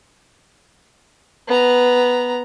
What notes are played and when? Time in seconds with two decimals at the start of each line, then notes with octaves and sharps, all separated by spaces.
1.48 B3 A#5